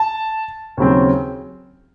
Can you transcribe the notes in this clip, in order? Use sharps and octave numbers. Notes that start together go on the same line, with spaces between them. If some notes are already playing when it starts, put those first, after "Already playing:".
Already playing: A5
D#2 C#3 F#3 C4